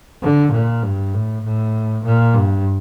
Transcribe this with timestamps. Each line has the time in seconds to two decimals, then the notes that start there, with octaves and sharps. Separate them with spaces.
0.22 D3
0.52 A#2
0.83 G2
1.14 A2
1.44 A2
2.04 A#2
2.35 G2